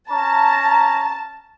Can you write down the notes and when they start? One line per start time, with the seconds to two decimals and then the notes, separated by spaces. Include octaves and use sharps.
0.10 C#4 A5 A#5